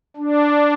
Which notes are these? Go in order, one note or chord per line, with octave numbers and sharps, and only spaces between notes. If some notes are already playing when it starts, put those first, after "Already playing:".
D4